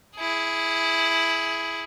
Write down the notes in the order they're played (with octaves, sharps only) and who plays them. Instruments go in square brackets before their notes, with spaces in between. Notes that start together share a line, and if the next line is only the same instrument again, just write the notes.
[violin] E4 G#4